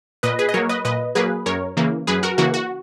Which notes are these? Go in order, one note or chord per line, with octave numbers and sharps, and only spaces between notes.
A#2 B4 D#5
G#4 B4
D#5
F#3 A#3 A#4 C#5
B4 D#5
A#2 B4 D#5
F#3 A#3 G#4 B4
F#2 A#4 C#5
C#3 E3 A#3
F#2 G#4 B4
F#4 A#4
C#3 E3 A#3 F#4
F#4